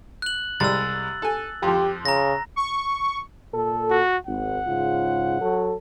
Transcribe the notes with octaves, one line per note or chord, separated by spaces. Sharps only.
F#6 F#7
C2 G3 G#3 E6 A6
A4 G#5
F2 F3 G4
C#3 A#5 A#6
C#6
A#2 A4
F#4
G#1 F#5
G#2 C#3 F4
F#3 A4